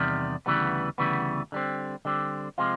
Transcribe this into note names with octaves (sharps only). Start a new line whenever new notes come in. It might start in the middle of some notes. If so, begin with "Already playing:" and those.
Already playing: E2 C3 D#3 G3
D2 C#3 E3 G3 B3
D2 C#3 E3 G3 B3
D3 G3 C4
D3 G3 C4
C3 F3 G#3 C4 F4